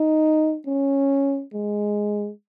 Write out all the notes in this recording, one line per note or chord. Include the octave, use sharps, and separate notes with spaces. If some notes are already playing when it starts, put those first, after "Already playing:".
Already playing: D#4
C#4
G#3